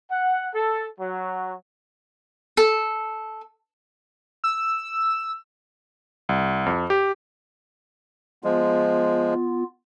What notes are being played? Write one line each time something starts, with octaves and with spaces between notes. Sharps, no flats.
F#5
A4
F#3
A4
E6
C2
F2
G4
F3 G#3 B3 F4